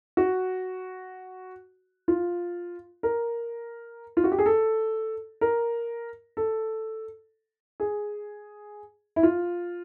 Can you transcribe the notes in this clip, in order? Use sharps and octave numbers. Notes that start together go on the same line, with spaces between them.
F#4
F4
A#4
F4
F#4
G4
G#4
A4
A#4
A4
G#4
E4
F4